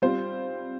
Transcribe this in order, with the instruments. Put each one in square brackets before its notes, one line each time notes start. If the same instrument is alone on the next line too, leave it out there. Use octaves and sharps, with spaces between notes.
[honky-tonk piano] G3 C4 F4 C5